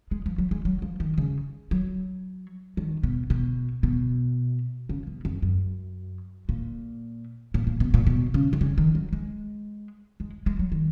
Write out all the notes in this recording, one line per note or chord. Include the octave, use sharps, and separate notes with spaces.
G#3
F3
F#3
G#3
F#3
F3
D#3
C#3
F#3
D#3
B2
B2
B2
C#3
B2
F2
F#2
A#2
A#2
A#2
B2
A#2
B2
C#3
D#3
C#3
D#3
F#3
G#3
G#3
G#3
F#3
D#3